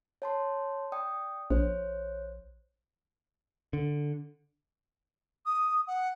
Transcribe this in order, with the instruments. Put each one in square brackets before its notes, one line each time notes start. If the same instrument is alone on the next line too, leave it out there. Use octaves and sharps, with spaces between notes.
[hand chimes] C#5 A5 C6
D5 G5 D#6
[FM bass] A#1 [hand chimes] C5 C#5
[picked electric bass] D3
[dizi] D#6
F#5